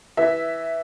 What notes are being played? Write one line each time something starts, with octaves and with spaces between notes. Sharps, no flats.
E3 E5